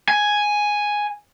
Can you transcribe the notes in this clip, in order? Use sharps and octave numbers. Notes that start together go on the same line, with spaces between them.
G#5